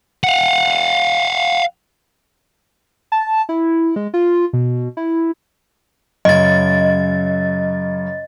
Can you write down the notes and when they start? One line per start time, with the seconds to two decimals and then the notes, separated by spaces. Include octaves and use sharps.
0.24 F5 F#5
3.12 A5
3.49 E4
3.96 G#3
4.14 F4
4.53 B2
4.97 E4
6.25 F#2 C#3 D#5 A6